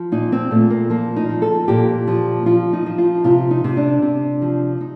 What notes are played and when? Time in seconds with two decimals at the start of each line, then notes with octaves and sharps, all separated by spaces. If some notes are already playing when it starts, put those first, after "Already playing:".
Already playing: F3
0.12 A#2 D#4
0.32 C4
0.51 A#2 A3
0.70 A#3
0.90 F3 A#3
1.16 D#4
1.29 F3
1.42 A4
1.68 A#2 G4
2.07 F3
2.46 F3 F4
2.73 D#4
2.86 F3
2.98 F4
3.24 C3 F4
3.51 D#4
3.64 C3
3.77 D4
4.02 C3
4.42 F3
4.81 D#4